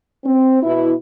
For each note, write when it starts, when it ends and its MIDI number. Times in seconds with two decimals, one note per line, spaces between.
0.25 0.60 60
0.63 0.92 47
0.63 0.92 59
0.63 0.92 64